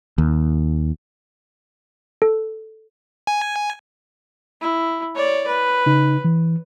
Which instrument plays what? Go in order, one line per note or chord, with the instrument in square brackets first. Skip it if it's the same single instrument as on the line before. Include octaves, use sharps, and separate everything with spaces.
[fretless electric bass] D#2
[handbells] A4
[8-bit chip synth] G#5
[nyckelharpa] E4
C#5 D5
B4
[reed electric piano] C#3 D#4
E3